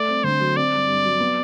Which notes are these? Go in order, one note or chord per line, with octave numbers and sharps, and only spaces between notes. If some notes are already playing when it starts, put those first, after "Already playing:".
Already playing: A3 D5
C4
D3 C5
F#3
C4 D5
G2
G2
F#3
B3